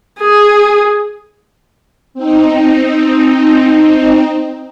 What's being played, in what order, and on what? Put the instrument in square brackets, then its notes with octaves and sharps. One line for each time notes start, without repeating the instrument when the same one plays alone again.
[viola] G#4
[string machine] C4 D#4